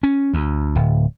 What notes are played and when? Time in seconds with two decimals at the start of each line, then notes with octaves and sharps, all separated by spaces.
0.03 C#4
0.34 D2
0.76 D1